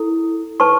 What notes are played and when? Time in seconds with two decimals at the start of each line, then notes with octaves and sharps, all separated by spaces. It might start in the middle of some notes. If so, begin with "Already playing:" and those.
Already playing: E4 A4
0.60 B4 A5 C#6